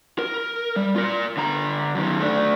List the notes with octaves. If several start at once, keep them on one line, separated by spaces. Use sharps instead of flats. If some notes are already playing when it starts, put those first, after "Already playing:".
A#4
G3
F4 A#4
D3 A#5
F#2 D#3
A3 D4